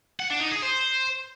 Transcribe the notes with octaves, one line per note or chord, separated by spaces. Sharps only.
F#5
D4
D#4
G#4
C5